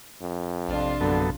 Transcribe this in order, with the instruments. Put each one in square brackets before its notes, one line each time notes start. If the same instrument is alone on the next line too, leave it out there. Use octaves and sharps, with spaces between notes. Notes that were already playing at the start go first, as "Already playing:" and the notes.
[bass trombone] F2
[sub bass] A#1 [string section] C3 D4 F4
[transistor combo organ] F#2 B3 A4 [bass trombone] D3